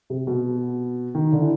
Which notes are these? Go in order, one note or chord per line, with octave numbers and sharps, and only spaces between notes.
C3
B2
D#3
D3
E3